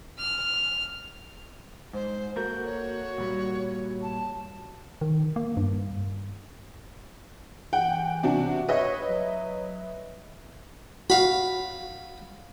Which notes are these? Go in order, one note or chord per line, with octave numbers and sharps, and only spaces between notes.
F6
G#2 C5
A#3 F#4 A4 A#4 G6
C#5
A#2 G3
A5
D#3
A#3
G2
E3 F#5 G5
C3 D4 F#4
B4 C#5 D#5 E5
F#3
F#4 F5 B5